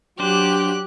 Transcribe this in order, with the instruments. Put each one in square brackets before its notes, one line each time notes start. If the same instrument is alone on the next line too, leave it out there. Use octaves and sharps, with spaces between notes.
[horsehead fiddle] F#3 [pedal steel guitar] D4 C5 [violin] G4 F#6